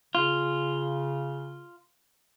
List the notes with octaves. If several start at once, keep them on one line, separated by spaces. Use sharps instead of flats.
C#3 F4